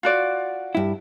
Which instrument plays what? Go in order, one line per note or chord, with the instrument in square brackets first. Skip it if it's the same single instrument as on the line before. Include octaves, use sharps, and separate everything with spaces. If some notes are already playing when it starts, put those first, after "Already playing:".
[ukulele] F4 F#4 D5
[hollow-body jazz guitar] G2 E4